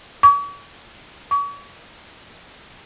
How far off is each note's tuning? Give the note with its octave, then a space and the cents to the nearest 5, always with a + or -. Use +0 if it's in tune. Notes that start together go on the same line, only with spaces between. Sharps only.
C#6 +45
C#6 +40